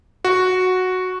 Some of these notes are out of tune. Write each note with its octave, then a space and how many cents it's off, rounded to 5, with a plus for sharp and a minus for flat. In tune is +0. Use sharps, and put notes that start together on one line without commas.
F#4 -5